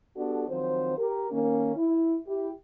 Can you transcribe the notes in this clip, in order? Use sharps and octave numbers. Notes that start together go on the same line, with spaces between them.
B3 D4 F#4 G4 A4
D#3 F3 F#3 C4 C5
G4 A#4
D#3 A#3 C#4
E4
E4 G4